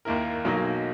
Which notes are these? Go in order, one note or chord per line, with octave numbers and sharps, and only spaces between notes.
D#2 D#3 A#3 E4 A#4
B1 B2 F#3 A#3 D#4